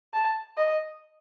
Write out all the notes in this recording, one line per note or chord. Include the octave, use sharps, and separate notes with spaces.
A5
D#5